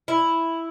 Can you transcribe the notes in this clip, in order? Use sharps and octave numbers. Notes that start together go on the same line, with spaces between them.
E4